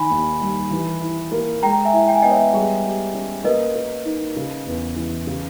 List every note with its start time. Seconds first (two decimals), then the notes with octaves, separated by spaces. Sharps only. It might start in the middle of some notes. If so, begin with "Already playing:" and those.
Already playing: D#3 G#5 B5
0.10 D#2
0.41 G3
0.71 E3
1.01 E4
1.32 A#3
1.63 G#3 G5 A#5
1.85 E5 G#5
1.93 E4
2.08 G5
2.15 G#5
2.22 B3 D#5 G5
2.30 C#5 E5
2.53 G3 G#4
2.84 G4
3.14 C#4
3.44 A#3 B4 D#5
3.75 A#4
4.05 D#4
4.36 C#3
4.67 E2
4.96 E3
5.27 C#3